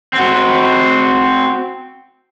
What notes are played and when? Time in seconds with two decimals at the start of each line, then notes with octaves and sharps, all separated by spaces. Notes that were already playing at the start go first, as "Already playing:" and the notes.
0.13 C4 F#4